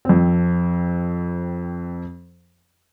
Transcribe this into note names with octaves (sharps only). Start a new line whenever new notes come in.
F2 C4